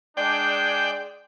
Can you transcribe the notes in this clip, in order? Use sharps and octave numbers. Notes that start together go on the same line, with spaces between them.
G#3 D4 D5 G5